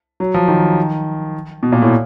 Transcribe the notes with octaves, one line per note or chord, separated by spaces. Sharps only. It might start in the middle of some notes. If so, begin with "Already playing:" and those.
F#3
F3
D#3
B2
A#2
A2